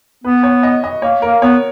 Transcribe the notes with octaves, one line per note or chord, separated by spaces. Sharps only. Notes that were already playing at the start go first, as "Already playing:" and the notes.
B3 B4
C#5
D#5
D#5
A#3 C#5
A#3 A#4
B3 C#5